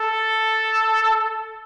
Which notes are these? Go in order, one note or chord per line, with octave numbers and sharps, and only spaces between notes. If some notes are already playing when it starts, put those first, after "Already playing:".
Already playing: A4